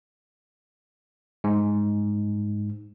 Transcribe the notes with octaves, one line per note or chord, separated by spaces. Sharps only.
G#2